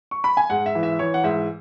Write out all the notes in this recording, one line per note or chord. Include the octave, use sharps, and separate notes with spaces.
C#6
B5
G#5
G#2 F#5
E5
E3
E5
E3 C#5
F#5
G#2 E5